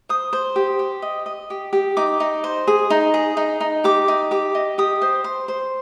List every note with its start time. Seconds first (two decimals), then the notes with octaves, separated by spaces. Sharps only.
0.09 C5 D#6
0.33 C5
0.56 G4
0.79 G4
1.02 D#5
1.26 D#5
1.50 G4
1.73 G4
1.97 D#4 D6
2.20 D#4
2.44 C5
2.67 G#4
2.90 D#4
3.14 G#4
3.37 D#4
3.60 D#4
3.84 G4 D6
4.08 D#4
4.31 G4 D6
4.55 D#5
4.78 G4 D#6
5.02 C5
5.24 C5
5.48 C5